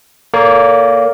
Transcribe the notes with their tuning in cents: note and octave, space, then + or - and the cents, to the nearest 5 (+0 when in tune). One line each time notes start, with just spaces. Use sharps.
A#3 +0 A4 +5 D5 -45